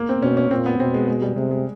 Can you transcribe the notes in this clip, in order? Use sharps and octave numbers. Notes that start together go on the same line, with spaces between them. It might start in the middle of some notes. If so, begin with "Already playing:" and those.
Already playing: A#3
C4
B2 C#4
C#4
A#2 C4
B3
B2 C4
G#3
G#3
G3
C3 G#3
G#3